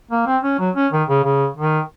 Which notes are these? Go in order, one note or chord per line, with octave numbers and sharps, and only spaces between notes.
A#3
C4
C#4
F#3
C#4
D#3
C#3
C#3
D#3